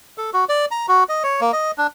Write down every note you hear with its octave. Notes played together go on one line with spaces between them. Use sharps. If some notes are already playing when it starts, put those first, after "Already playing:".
A4
F#4
D5
A#5
F#4
D#5
C#5
A#3
D#5
D4